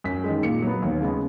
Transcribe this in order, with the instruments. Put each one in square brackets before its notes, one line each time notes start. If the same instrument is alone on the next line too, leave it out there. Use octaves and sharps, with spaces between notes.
[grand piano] F#2 B6
D#3 G#3
A#2 C#7
F#3 B3
D#2
C#3 G#3 B3